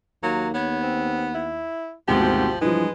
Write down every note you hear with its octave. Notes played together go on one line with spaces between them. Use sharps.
D#2 F#3 A#3
B3 C#5
C4
E4
G#1 D2 G#2 B2 F3 G4
G2 E3 F3 G#3 B4